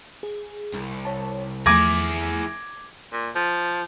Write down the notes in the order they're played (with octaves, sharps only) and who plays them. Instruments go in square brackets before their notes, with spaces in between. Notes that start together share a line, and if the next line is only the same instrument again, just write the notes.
[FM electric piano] G#4
[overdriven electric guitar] C2
[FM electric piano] C#5 A5
[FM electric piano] E2 F3 A3 [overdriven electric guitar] E4 G#4 [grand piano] D6 G#6 A#6
[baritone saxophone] A#2
F3